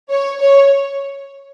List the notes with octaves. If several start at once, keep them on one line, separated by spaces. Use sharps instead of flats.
C#5
C#5